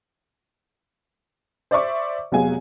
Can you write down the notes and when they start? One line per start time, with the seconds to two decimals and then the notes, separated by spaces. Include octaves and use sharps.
1.71 C5 D5 E5 C#6 D6
2.32 F1 F#3 G#3 B3 F5 G#5